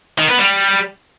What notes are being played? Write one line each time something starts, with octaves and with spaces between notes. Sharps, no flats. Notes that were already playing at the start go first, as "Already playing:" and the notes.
D#3
B3
G3